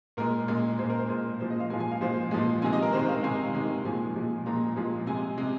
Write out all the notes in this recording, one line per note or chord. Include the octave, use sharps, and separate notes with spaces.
A#2 G#3 A#4
A#2 G#3
A#2 G#3 C5
A#4
C5
A#2 G#3
A#2 F3 G#3 C5
D#5
F5
A#2 F3 G#3 G#5
G#5
F5
A#2 F3 G#3 C5
A#2 F3 G#3
C3 D#3 G#3 G#5
D#5
A#4
C3 D#3 G#3 C5
F5
C3 D#3 G#3 G#5
C3 D#3 G#3
A#2 F3 G#3 G#5
A#2 F3 G#3
A#2 F3 G#3 A#5
A#2 F3 G#3
C3 G#3 G#5
C3 G#3